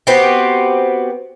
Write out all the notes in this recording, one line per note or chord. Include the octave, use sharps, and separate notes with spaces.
B3 C4 F#4 G4